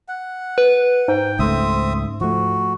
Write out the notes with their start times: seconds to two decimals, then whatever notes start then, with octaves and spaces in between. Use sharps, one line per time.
0.08 F#5
0.58 B4
1.08 G#2 G5
1.39 C#2 A3 C4 E5 D#6
2.21 F3 A3 F#4